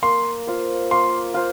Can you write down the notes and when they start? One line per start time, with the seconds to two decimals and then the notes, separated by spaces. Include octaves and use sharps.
0.02 A#3 C6
0.47 F4 C5
0.91 A#3 C6
1.34 F4 C5